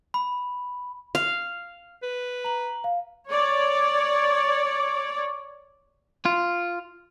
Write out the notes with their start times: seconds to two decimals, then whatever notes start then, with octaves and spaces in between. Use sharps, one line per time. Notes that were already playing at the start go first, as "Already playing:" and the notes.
0.14 B5
1.15 F5
2.02 B4
2.44 A#5 F#7
2.84 F5
3.28 C#5 D5
6.25 F4